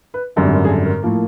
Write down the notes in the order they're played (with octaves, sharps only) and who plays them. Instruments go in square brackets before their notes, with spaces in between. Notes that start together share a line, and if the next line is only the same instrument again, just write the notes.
[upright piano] B4
G#1 F#2 D3 G3 A#4
A#4
G#4
A4
A#4
A2 F3 A#3